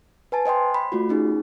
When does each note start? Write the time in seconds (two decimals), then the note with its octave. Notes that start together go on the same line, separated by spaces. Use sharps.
0.32 B4 G#5 A5
0.46 C5 D#5 G5 C6
0.74 B5
0.92 A3 F4 F#4
1.09 C#4 D#4 G#4